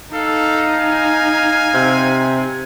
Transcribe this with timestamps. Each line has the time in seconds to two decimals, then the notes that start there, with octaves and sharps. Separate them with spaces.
0.13 D#4 A4 F5
0.80 G#5
1.74 C3